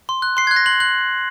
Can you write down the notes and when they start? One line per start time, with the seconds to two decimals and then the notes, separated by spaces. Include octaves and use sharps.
0.09 C6
0.22 F#6
0.37 C6 C7
0.47 G#6
0.51 F#6
0.56 A#6
0.66 C6 F#7
0.80 F#6 F#7